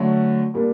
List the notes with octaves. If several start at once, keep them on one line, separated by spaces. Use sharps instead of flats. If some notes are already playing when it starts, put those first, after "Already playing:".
Already playing: D3 F#3 A3
A#2 G3 A#3 D4